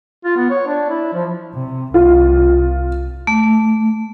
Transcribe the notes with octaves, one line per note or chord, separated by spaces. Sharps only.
F4
B3
C#5
D4
E4
F3
C3
C2 F4
A3